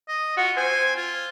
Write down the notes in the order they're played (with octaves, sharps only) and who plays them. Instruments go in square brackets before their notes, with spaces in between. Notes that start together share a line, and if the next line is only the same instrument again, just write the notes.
[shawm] D#5
[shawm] F4 [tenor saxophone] F#4
[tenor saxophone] C4 [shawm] G#5
[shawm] F4